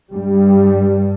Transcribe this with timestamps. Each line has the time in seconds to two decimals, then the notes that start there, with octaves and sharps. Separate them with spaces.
0.13 G2 G3